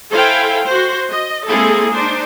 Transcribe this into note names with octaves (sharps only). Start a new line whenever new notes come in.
E4 A4 C5 F5 G5 G#5
F#4 C5
D#5
G#3 A#3 C4 E4 G#4 A4
D4 D#4 C5